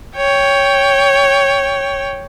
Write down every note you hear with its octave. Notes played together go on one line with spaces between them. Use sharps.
C#5 G5